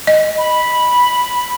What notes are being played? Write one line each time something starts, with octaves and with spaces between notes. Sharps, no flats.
D#5
B5